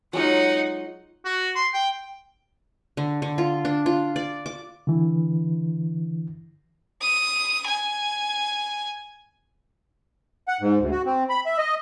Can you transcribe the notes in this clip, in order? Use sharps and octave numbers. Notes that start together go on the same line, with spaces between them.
F#3 G#3 D#4 F4 F#5
F#4
C6
G5
D3
D3
F4
D4
F4
D5
D6
D3 E3
D#6
G#5
F#5
G#2
D2
F#4
C4
B5
E5
D#5